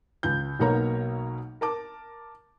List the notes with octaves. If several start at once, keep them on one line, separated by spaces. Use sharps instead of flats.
C#2 G6
B1 B2 A#3 C#5 A#5
A#4 A5 D6